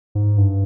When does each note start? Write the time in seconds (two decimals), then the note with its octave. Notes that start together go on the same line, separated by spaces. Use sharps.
0.15 G#2
0.38 G2